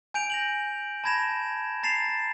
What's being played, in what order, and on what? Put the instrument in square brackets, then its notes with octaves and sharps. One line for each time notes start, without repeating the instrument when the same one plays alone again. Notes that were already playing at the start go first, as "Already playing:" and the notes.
[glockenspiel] G#5 G6 D7 F7
A#6 F7 F#7
A5 B5 G#6 A#6 E7 F7
A#5 A6 C7 E7 F7